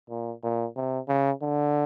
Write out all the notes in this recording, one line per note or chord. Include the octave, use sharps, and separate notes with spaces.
A#2
A#2
C3
C#3
D3